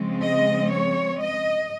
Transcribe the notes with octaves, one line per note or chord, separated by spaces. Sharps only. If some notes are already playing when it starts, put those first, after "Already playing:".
Already playing: C#3 F3 G#3 C4
D#5
C#5
D#5